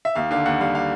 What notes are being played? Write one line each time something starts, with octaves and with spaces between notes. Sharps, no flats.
E5
D#2 F5
D3 F5
D#2 F#5
G3 F5
F5